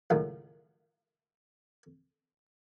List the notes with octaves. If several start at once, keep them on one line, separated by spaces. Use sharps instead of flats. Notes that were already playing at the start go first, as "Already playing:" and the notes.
C#2 F#2 A2 D#3 F#3